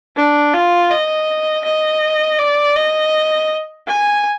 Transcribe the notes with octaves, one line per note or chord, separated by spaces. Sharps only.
D4
F4
D#5
D#5
D5
D#5
G#5